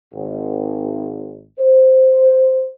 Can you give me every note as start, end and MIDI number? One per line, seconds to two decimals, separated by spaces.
0.13 1.42 32
1.59 2.68 72